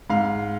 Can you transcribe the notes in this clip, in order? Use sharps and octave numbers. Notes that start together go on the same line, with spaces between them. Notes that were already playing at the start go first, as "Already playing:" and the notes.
G#2 F5